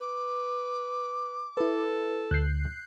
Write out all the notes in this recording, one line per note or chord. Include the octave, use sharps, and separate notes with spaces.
B4 D6
E4 A4 B4
D2 F#6 G6 C7